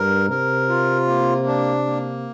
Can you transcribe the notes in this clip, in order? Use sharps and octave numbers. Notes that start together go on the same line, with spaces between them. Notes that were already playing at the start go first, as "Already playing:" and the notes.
Already playing: G2 A#4
C3 A#4
F4
A#3
D4
A#3